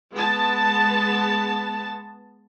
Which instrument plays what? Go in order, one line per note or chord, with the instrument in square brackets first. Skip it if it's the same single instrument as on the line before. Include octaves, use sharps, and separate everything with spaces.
[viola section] G#3 B3 A5